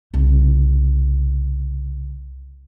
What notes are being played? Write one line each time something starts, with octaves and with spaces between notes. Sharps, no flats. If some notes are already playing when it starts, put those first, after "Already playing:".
C2 C#3